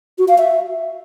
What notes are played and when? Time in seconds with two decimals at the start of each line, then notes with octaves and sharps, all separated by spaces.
0.18 F#4
0.28 F5
0.38 E5